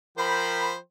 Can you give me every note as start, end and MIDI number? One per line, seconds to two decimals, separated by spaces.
0.18 0.76 53
0.18 0.72 70
0.18 0.76 72
0.18 0.76 79
0.18 0.72 83